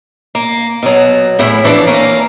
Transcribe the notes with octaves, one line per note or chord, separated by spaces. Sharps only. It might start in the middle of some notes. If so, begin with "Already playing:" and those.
A#3
B2 F#3
E2 A2 E4
E3 F3 D4
A#3 C#4 A#4